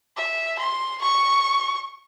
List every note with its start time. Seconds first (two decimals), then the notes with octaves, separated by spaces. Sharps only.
0.16 E5
0.59 C6
1.01 C#6